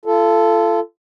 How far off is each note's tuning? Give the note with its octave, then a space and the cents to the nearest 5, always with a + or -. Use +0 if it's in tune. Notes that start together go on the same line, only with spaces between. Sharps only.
F4 -30 A4 +0